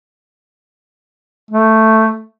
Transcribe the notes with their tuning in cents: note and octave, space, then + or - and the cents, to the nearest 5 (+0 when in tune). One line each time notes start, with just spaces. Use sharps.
A3 +5